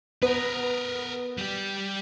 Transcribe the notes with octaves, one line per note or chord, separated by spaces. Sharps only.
B3 A#4 B4
G3 G4